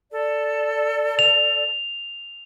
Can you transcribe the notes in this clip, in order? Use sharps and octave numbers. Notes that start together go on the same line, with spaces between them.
A4 D5
F7